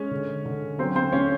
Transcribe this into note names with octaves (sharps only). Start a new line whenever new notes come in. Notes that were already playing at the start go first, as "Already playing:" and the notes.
Already playing: G#3 C#4 C#5
D3
D3
F#3 C4 C5
C4 C5
A3 C#4 C#5